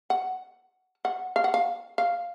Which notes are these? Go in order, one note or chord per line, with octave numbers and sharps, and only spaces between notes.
F#5
F#5
F5
F#5
F5
F5